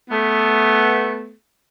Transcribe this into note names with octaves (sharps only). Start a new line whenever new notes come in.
A3 B3